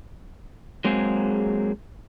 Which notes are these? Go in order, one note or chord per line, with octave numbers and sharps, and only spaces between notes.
F#3 G#3 A#3 C4 G#4